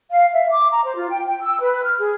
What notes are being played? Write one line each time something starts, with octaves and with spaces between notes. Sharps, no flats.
F5
E5
D6
A#5
C5
F4
G5
G5
E6
B4
F6
G#4